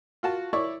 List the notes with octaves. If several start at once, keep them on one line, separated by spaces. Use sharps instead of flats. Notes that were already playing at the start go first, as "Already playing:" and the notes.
F4 F#4 A5
E4 C#5 D5 C#6